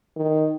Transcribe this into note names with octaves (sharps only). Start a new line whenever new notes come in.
D#3